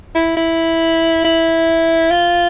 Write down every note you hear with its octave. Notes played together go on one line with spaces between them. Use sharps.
E4
E4
E4
F4